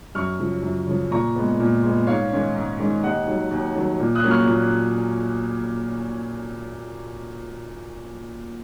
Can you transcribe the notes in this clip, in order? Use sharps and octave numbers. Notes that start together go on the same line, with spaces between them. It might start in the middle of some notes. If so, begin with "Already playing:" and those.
F#2 C#6 F6
C#3 F3
F#2
C#3 F3
A#2 A#5 C#6
G#3 B3
A#2
G#3 B3
G#2 C#5 F5
D#3 G#3 C#4
G#2
D#3 G#3 C#4
D#2 D#5 F#5
D#3 F#3
D#2
D#3 F#3
A#2
D#6 F#6
F#3 A#3 C#4
C#6 F6
A#2